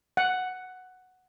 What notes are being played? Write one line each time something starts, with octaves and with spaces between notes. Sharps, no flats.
F#5